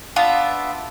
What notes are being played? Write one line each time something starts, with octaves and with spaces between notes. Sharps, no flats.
B3 D4 F4 E5